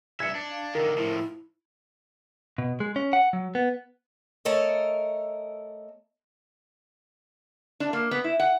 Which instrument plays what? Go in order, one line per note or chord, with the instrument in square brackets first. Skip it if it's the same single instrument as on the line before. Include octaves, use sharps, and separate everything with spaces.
[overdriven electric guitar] G2 E5 [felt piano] G#6 C#7
[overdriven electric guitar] D4
[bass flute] F5
[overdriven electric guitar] D3 D#3 [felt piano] A#4
[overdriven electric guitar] A2 F3 [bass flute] E4
[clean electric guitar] B2
G#3
C#4
F#5
F#3
B3
[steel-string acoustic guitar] A3 A4 A#4 C#5 D#5
[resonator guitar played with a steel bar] D4
A#3
B3
E4
F#5